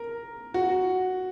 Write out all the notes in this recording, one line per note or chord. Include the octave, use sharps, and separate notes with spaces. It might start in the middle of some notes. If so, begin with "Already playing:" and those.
Already playing: A#4
F#4